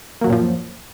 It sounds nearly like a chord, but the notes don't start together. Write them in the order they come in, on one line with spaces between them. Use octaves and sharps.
A#3 F#3 F#2 A#2 F3